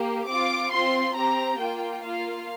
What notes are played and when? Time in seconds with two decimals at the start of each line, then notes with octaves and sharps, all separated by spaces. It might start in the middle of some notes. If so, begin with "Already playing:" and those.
Already playing: A#3 G4
0.27 C4 F4 D6
0.71 C4 F4 C6
1.16 C4 G4 A#5
1.59 A#3 F4 G5
2.03 A#3 F4 F5